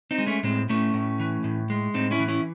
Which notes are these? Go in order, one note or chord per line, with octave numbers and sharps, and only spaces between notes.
C4 D#4
G#3
A3 C#4
A2 G#3 C4
A2 A3 C#4
A2
E3
A2
G#3
A2 C4 D#4
C#4 E4
E3
C#4 E4